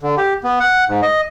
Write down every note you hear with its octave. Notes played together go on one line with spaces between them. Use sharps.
D3
G4
B3
F#5
G#2
D#5